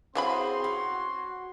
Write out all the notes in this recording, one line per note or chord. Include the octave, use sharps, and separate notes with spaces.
E3 F#3 C4 G#4 C5 F5 B5 C6
C#4 F#4